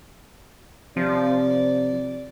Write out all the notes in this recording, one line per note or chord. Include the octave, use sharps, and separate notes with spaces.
C3 F3 D5